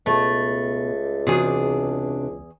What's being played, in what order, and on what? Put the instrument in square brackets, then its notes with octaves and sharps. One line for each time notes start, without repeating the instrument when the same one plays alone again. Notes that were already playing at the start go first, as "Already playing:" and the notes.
[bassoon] C#2 [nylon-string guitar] B2 E5 [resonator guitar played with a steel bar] A3
[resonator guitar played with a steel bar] E2 G#4 [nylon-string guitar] C3 D4 F#4